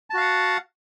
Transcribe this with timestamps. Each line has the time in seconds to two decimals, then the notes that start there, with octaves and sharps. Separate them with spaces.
0.10 A5
0.14 F#4
0.17 F5
0.21 F#5